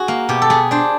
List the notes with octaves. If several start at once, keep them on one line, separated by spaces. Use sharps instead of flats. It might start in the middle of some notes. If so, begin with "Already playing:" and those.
Already playing: F#4 G#4
A#3
B2 G4
A4
B3 G#4
D4 C5